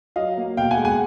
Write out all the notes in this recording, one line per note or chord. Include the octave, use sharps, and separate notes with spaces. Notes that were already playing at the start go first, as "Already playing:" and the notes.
F#3 D#5 F5
A#3
B2 F5 G5
F#5 G#5
G#3
F#5 G#5